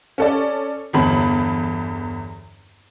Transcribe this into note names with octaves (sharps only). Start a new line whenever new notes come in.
C#4 A4 D5
G1 E2 B5